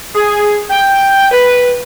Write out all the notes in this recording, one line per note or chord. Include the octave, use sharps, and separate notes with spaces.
G#4
G5
B4